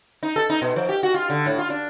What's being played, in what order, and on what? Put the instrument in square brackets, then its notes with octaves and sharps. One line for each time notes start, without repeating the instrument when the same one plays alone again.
[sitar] D#4
A4
D#4
B2
F3
G4
F#4
F4
D3
A2
F4
D4